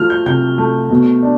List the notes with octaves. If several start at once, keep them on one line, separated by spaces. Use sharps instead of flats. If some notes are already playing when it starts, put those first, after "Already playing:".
Already playing: F3 A3 F6
G6
C3 G6
A3
B2
D4